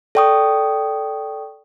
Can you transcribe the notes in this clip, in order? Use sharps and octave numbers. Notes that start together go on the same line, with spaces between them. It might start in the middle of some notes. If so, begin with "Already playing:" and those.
A4 D5 G5 C#6 D#6